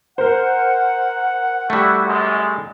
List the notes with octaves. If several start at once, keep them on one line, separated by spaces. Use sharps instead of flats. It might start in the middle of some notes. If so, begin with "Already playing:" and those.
A#4 C5 F#5
G3 A3 E4 F#4
F#2 G#3